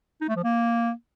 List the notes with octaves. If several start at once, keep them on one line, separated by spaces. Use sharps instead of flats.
D#4
A3
F3
A#3